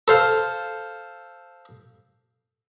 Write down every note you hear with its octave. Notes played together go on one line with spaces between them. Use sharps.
A4 C5 F5